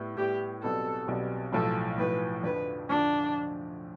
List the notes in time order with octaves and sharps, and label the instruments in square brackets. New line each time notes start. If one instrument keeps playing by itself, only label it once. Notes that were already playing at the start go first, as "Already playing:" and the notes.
Already playing: [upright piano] A2 G3 B3 E4
[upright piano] A2 G3 B3 E4 [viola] G4
[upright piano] B1 B2 G3 C4 [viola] A4
[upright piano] B1 B2 G3 C4
[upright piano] B1 A2 F3 [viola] A4
[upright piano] B1 A2 F3 [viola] B4
[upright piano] F2 D3 F3 [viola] B4
[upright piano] F2 D3 F3 [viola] D4